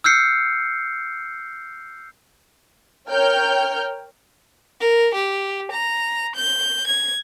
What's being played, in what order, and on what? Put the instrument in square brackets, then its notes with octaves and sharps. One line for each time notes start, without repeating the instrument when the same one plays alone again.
[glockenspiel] E6 F6 G6 C7 C#7
[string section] A#4 C#5 G5 F6 G6
[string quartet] A#4
G4
A#5
G6
G#6